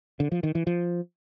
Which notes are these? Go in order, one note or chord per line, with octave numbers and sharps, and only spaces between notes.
D3
F3
D#3
E3
F3